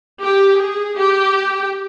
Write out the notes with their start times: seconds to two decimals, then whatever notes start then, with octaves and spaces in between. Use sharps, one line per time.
0.23 G4
0.61 G#4
0.98 G4